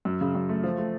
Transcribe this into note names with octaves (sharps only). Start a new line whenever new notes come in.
F#2
C#3
F#2
A3
F3
A3